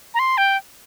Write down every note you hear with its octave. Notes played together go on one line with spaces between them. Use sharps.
A#5
C6
G5